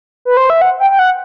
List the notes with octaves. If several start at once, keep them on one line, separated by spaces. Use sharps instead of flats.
B4
C5
E5
F#5
G5
G5
F#5